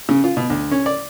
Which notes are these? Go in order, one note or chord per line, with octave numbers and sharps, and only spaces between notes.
C#3
F4
B2
D2
C#4
D5